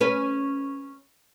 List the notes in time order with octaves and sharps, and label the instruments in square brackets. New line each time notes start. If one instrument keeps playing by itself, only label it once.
[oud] C#4 B4